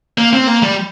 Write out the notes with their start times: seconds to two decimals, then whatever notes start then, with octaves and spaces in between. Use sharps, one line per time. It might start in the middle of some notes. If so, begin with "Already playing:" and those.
0.18 A#3
0.33 C4
0.47 A#3
0.62 G3